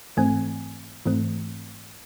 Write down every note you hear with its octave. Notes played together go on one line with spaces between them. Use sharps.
G#2 E3 A3 C4 G#5
G#2 E3 A3 C4